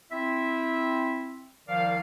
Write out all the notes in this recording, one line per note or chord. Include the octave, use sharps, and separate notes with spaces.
C4 E4 E5
C2 D#3 F3 D5 F5